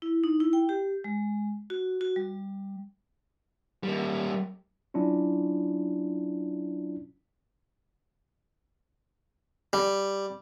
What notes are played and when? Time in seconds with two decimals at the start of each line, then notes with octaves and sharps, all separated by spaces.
0.02 E4
0.24 D#4
0.40 E4
0.53 G5
0.69 G4
1.04 G#3
1.70 F#4
2.01 F#4
2.16 G3
3.83 G3 A#3
4.94 F#3 C#4 D4 E4 F4
9.73 G3